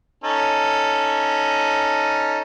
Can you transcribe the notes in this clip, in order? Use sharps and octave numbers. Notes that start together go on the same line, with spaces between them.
C#4 D#4 A4